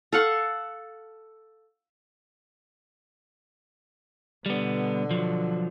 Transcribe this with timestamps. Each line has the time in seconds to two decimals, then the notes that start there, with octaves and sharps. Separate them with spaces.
0.13 A4 F5 F#5 C#6
4.46 B2 D3 G3 B3
5.11 F3 F#3